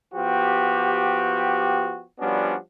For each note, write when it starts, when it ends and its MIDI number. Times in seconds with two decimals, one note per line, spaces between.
0.14 2.03 53
0.14 2.03 59
0.14 2.03 66
0.14 2.03 67
2.20 2.56 53
2.20 2.56 55
2.20 2.56 59
2.20 2.56 61
2.20 2.56 62
2.20 2.56 66